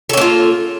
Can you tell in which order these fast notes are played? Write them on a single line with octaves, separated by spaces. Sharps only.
A4 C#4 A#3 F4